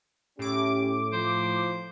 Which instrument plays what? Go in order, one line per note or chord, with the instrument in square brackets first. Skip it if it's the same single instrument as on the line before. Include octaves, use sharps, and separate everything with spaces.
[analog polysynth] A2 D6 [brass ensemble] C#4 G4
[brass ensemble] F3 [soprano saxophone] C5